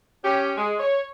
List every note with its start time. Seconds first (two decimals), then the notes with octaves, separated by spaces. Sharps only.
0.24 C#4 G4
0.57 G#3
0.79 C#5